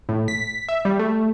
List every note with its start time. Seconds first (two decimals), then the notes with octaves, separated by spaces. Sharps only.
0.09 A2
0.28 B6
0.69 E5
0.85 G3
0.99 A3